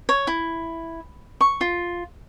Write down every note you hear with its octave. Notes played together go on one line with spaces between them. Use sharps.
C#5
E4
C#6
F4